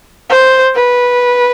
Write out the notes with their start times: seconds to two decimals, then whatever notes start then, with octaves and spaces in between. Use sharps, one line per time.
0.30 C5
0.75 B4